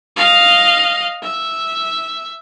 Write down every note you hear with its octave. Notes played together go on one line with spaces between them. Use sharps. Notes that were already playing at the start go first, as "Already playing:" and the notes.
D#5 F5
E5